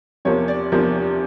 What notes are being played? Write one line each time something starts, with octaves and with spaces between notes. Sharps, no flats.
E2 C3 F3 A#3 C#5
D5
E2 C3 F3 A#3